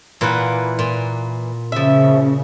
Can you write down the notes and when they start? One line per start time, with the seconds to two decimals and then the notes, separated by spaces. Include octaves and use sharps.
0.21 A#2 E3 A#3 B4 F#5
0.79 A#2
1.72 C#3 F3 E5